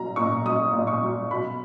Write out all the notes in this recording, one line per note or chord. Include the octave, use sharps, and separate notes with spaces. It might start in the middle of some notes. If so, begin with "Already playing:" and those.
Already playing: A#2 F#3 A#5
A#2 C#6
F#3 D#6
A#2
C#6
F#3
B2 B5